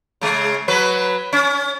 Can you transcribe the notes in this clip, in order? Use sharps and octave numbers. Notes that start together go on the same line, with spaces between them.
C#3 G#3
F#3 B4
C#4